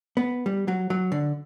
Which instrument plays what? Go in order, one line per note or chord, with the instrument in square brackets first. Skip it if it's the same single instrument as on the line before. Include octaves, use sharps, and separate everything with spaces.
[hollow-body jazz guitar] B3
G3
F#3
F#3
D3